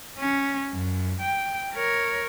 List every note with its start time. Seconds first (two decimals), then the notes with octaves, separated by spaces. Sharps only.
0.18 C#4
0.73 F#2
1.21 G5
1.74 A#4 C#5